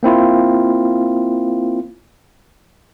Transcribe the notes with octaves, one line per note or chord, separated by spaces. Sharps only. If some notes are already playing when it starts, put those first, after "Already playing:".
A#3 C4 E4 F4